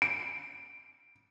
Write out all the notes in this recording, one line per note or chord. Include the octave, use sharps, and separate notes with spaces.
D7